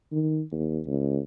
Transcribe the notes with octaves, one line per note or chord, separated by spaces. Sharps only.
D#3
D#2
C#2